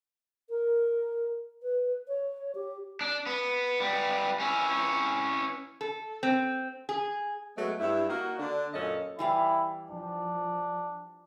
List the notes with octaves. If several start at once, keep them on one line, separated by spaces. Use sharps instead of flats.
A#4
B4
C#5
G4
D4
B3
G3 B3
C#4 E4
A4
C4
G#4
F#3 G#3 A3 B3
G2 E4
A#3 D#4 F#4
D3 D4
F#2 A#2 C#4 A4 D#5
E3 G3 E4 F5
F3 D4